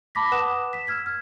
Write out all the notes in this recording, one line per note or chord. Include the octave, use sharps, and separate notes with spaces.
A5 B5 D6 A#6 B6
B4 F#5 D6 D#6 F#6 E7
B6 E7
E6 F6 G#6 B6
F6 G#6